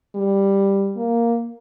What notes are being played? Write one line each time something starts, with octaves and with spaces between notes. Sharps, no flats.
G3
A#3